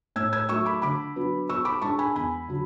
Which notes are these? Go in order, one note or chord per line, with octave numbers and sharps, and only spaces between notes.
A2 E6 G#6
E6 G#6
F#3 A3 C#6 E6
B5 D6
D3 B5 D6
F#3 B3 D4
B2 C#6 E6
B5 D6
G#3 D4 A5 C#6
G#5 B5
E2 G#5 B5
D3 F#3